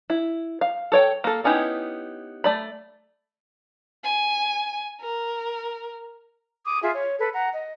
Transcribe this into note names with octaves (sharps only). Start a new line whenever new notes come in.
E4
F5
A4 C#5 G5
A#3 A4
B3 C#4 D#4 E4 G4
A3 D5 B5
G#5
A#4
D6 D#6
F4 G#4 E5
C#5
A4 B4
F#5 A#5
D#5